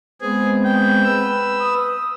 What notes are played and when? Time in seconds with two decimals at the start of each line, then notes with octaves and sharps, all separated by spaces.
0.22 G#3 B3 C4 G#4
0.65 G5
1.03 B4 E6
1.60 D#6